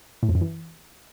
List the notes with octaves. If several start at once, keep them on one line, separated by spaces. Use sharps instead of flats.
A2
F2
F#2
E3